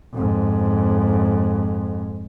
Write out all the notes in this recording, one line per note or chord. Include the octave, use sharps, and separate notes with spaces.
F2 G#2